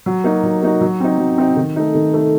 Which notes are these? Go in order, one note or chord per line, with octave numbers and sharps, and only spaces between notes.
F#3
A#3 D#4 F#4
F#3
A#3 D#4 F#4
F#3
C4 D#4
F#3
C4 D#4
D#3
A3 D#4
D#3
A3 D#4